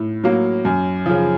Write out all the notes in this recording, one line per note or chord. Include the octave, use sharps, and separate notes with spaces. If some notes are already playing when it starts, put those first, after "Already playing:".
Already playing: A2
F#3 A#3
F#2
C#3 F3